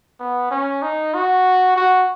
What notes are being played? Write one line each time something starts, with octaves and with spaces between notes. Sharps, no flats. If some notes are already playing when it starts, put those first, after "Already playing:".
B3
C#4
D#4
F#4
F#4